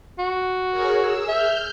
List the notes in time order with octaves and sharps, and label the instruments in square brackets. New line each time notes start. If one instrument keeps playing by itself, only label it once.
[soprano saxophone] F#4
[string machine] G#4 A#4 C#5
G#4 E6
[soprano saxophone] E5 [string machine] F6 G6